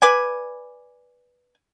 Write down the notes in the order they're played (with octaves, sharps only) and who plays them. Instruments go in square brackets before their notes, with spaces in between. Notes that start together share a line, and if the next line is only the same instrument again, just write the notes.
[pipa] B4 D5 G#5